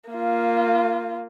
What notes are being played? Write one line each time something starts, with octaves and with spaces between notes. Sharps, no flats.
A#3 F4